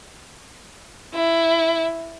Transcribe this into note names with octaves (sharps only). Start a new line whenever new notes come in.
E4